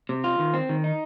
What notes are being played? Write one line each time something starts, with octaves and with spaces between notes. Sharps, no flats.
C3
F4
D#3
C4
D#3
D#4